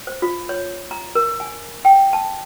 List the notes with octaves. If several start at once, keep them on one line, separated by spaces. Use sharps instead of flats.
C5
F4
C#5
A#5
A#4
G#5
G5
A5